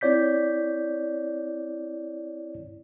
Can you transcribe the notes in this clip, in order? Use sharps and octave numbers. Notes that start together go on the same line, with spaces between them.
C4 E4 C#5 D5 G6 B6